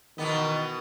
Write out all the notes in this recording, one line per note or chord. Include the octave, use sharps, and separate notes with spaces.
B2 D#3 E3 B3